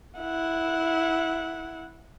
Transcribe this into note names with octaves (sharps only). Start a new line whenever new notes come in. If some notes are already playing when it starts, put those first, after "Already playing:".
E4 F#5